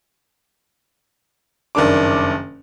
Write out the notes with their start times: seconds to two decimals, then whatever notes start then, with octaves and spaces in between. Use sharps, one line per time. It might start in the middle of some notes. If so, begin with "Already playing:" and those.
1.75 F#1 G2 D#3 D4 D6